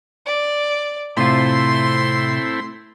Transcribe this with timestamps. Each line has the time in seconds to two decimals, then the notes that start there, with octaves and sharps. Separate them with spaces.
0.26 D5
1.17 A2 C3 A3 C4 E4 F4 C6